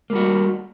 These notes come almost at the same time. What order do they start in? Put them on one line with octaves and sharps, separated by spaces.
A#3 G3 F#4